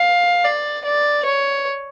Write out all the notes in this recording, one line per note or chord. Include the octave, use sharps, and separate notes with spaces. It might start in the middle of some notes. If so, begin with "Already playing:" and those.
Already playing: F5
D5
D5
C#5